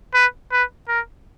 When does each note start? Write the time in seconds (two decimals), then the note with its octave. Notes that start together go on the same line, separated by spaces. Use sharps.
0.14 B4
0.52 B4
0.89 A#4